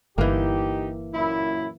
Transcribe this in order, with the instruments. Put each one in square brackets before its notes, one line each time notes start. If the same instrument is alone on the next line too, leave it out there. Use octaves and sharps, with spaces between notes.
[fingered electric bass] G1 [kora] E3 A#3 [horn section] D#4 G4
[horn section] F#2 A#2 E4